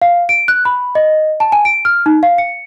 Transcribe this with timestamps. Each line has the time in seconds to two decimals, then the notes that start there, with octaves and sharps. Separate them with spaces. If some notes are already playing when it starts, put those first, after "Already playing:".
0.02 F5
0.29 D7
0.48 F#6
0.65 B5
0.95 D#5
1.40 A5
1.52 G#5
1.65 D7
1.85 F6
2.06 D#4
2.23 F5
2.38 C#7